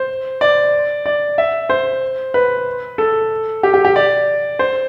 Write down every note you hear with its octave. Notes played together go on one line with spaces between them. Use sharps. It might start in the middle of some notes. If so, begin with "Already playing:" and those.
Already playing: C5
D5
D5
E5
C5
B4
A4
G4
G4
G4
D5
C5